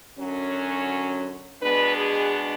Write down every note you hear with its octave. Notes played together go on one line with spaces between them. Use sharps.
F#2 D3 F#3 C#4
B2 G#3 B3 D4 B4
G#4